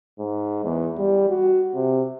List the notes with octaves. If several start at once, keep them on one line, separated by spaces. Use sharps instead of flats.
G#2
E2
G3
F#4
C3